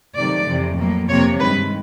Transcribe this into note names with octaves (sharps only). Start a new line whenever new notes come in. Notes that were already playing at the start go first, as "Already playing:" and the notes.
C3 D#3 F#3 A3 D5
F2 C3 E3
A2 F#3 A#3
F2 C3 F3 A#3 C#5
G2 D#3 G#3 B4